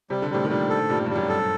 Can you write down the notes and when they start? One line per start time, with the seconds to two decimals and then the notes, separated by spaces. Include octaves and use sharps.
0.10 C3 G3
0.22 D3
0.30 A2 C3 G3
0.44 D#3
0.50 A#2 D3 G3
0.70 A4
0.89 G2 A#2 G3
1.06 G2 G3
1.16 F#2
1.29 A4